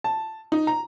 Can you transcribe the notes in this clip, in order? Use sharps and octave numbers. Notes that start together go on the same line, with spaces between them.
A5
D#4
A#5